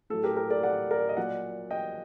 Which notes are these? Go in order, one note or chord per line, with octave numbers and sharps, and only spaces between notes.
A2 F#3 A4
G4 A#4
G4 A#4
A#4 D5
D5 F#5
A#4 D5
D#5
A#2 F#3 D5 F#5
D#5 G5